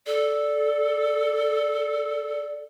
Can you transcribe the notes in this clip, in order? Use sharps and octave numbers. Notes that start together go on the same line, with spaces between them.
A4 D5